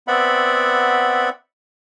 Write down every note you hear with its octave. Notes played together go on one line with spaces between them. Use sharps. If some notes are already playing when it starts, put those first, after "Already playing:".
B3 C4 D5 E5 F#5 B5